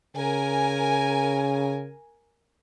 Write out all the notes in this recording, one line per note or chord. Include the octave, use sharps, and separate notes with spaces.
C#3 A#4 G#5